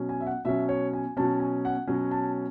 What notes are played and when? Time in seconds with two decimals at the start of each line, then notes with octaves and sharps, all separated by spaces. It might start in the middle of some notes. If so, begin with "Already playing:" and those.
Already playing: B2 F#3 C#4
0.09 G#5
0.21 E5
0.27 F#5
0.45 B2 F#3 C#4 E5
0.69 C#5
0.93 G#5
1.17 B2 F#3 C#4 A5
1.40 G#5
1.65 F#5
1.87 B2 F#3 C#4
2.11 A5